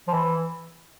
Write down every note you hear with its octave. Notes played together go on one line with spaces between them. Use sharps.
F3
E3